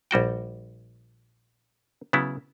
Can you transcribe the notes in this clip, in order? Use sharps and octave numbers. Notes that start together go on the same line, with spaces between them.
A#1 G3 F#4 G5
C#3 F#3 B3 E4